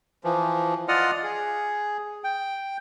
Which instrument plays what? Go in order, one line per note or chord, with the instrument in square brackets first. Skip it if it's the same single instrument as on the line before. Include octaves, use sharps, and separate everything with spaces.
[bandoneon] E3 F3
F4 D5 D#5 F#5 D#6 F6
G#4
G5